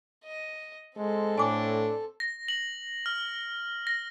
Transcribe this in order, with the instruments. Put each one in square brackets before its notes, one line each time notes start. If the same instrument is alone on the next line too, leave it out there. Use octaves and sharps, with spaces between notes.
[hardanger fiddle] D#5
[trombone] G#3 [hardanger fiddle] C4 A4
[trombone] A2 [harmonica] D4 [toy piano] G#5 D6
[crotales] A#6
F#7
F6
A#6